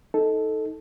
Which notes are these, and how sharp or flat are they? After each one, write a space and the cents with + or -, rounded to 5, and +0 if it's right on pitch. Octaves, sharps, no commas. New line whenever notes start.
D#4 +15 A4 -5